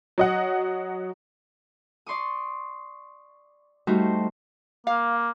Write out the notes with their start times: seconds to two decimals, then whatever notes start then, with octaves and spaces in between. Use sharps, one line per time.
0.18 F#3 D#5 F#5
2.06 D5 C6 C#6 D#6
3.87 G3 A3 D#4 F#4 C5
4.87 A#3 F5